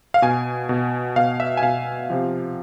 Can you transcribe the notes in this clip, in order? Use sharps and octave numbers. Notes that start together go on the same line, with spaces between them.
F5
B2 G#5
B2
B2 F5
E5
G#5
B2 F5
C3 F3